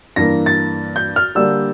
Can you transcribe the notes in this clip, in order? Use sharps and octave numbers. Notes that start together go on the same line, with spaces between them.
G2 E3 A#3 A#6
A6
G6
F6
D3 G3 A#3 D4 E6